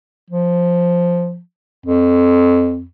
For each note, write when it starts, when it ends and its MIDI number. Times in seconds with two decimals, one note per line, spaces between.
0.30 1.39 53
1.86 2.85 41